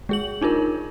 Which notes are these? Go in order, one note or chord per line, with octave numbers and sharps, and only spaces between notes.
G#3 G#4 F#7
D4 D#4 F4 A#4